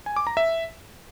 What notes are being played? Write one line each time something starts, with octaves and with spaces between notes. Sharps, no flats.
G#5
D6
A#5
E5